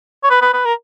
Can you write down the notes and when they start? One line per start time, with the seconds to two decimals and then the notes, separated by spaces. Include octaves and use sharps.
0.24 C#5
0.30 B4
0.42 B4
0.54 B4
0.65 A#4